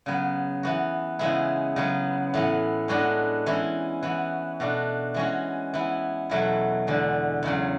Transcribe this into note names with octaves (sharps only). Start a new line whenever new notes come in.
C#3 F#3 B3
E3 B3 F#4
C#3 E3 G#3 B3 E4
C#3 F#3 B3
A2 E3 B3
A2 G#3 B3 D4 F#4
E3 G#3 C#4 E4
E3 B3 F#4
B2 A3 D4 F#4
E3 G#3 C#4 F#4
E3 B3 E4
E2 B2 F#3 A3 E4
E2 D3 G#3
E2 C#3 F#3